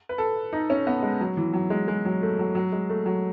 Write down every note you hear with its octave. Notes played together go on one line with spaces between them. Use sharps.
B4
A4
D#4
C#4
B3
G#3
F#3
E3
F#3
G#3
G#3
F#3
A3
F#3
F#3
G#3
A3
F#3